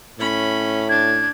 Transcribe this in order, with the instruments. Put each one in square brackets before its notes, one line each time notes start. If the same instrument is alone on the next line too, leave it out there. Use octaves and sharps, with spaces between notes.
[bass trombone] A2 [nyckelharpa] C#4 B5
[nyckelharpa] D4 [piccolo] G#6